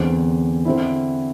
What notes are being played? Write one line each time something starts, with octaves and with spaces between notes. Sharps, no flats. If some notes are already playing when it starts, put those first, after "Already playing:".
Already playing: E2 D3 C4
D3 C4 E4